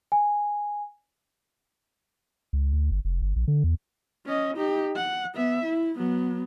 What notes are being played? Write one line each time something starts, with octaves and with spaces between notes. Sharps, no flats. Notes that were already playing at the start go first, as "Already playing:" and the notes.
G#5
C#2
D2
G1
F1
G1
A#1
D3
E2
C#4 D#5
D#4 G4
F#5
B3 E5
E4
F#3 B3